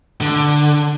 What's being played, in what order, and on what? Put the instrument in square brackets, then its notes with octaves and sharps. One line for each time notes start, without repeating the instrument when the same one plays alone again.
[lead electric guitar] D3